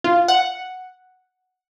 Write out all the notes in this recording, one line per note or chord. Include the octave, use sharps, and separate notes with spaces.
F4
F#5